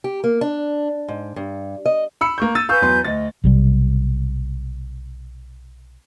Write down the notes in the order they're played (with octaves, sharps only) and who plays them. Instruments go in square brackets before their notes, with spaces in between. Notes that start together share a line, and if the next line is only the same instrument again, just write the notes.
[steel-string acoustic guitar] G4
A#3
D4
G#2
G2
D#5
[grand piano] B5 E6 C#7
A#3 C#6 G6
E6 A6 D#7
[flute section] B4 G#5 G6 [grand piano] F5 C#6 E6
[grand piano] E2 F#3 C6
[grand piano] D2 A6 [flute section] D#5
[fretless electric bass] B1 C3 G3